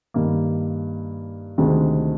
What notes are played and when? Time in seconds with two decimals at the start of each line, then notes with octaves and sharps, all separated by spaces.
0.14 G2 D#3 A#3 D#4
1.58 D2 C3 D#3 G#3 D4